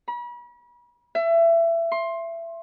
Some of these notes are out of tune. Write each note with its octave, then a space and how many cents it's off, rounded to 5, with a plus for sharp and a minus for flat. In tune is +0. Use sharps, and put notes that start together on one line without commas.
B5 -40
E5 +25
C6 +20